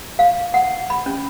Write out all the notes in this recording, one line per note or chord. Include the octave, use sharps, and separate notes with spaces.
F5
F#5
B5
C#4